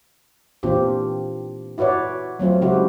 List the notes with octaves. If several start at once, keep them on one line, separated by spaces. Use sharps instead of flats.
A#2 E3 C4 D4 F4 G4
E4 F#4 B4 C#5 D5
F#3 A3 C4 F4
C#3 G#3 C4 E4 F#4 G4